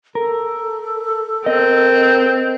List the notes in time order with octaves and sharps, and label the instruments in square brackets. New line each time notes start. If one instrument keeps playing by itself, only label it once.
[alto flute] A4 [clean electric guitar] A#4
[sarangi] C4 [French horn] A#4 [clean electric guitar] D#5